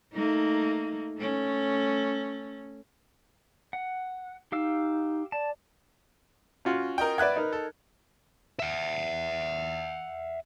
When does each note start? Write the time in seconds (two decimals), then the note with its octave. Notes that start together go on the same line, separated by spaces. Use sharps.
0.13 A3 A#3 D#4
1.18 A3 C#4
3.73 F#5
4.52 D#4 G4 F5 E6
5.32 D5 A5
6.65 C#4 F4 F#4
6.98 A#4 D#5 G5
7.18 B4 D5 E5 F#5 F#6 G#6
7.36 D#4 A#4
7.53 A4
8.60 E5 F#5